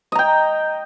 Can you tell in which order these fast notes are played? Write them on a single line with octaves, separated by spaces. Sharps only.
D#5 A#5 G5